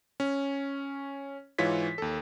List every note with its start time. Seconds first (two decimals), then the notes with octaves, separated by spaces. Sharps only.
0.20 C#4
1.58 G#2 E3 F4 C#5 B6
1.98 D#2 A4